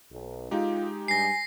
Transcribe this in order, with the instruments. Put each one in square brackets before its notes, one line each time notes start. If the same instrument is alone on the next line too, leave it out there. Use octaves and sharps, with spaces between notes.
[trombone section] B1
[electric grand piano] G#3 D#4 G4 [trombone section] F4
[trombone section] G2 [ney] G#5 [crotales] A#6 C7